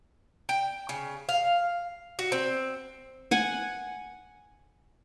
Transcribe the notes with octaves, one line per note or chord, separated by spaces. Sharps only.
G5
C#3
F5
F#4
C4
F#5 G#5